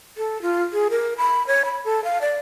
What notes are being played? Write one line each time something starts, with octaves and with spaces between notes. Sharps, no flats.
A4
F4
G#4
A#4
B5
C#5
B5
A4
F5
D5